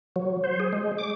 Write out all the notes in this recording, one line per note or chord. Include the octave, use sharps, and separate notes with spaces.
F#3
C5
G#4
G#3
D6